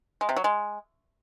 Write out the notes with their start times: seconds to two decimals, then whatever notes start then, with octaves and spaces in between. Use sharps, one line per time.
0.21 G#3
0.29 C3
0.36 F#3
0.44 G#3